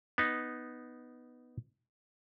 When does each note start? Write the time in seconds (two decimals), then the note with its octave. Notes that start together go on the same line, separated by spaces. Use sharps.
0.18 B3 D#4